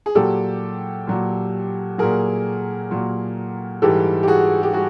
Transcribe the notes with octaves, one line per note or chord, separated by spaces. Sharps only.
G#4
A#2 F#3 G4 A4
A#2 F#3
A#2 F#3 G#4 A#4
A#2 F#3
G#2 E3 G3 G4 A4
G4
F#4 G#4
G4
G3 F#4 G#4